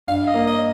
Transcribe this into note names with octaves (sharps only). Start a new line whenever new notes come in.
G2 F5
D#5
A#3
D#5